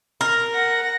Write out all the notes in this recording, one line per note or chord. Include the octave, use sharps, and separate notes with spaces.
A#4
F#5 A#6